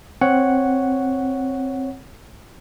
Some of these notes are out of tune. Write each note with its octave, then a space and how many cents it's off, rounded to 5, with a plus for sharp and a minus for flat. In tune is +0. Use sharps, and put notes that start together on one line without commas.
C4 +10 C#5 +0 F#5 +0